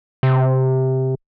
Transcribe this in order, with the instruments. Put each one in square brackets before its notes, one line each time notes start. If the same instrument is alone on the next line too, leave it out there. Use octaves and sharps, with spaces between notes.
[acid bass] C3